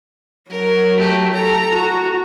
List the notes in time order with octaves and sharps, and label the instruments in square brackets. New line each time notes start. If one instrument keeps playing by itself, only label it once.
[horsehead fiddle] F#3 [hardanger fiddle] A#4
[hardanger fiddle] A3 G4
[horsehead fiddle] A4 [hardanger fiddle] A#5
[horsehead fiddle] F#4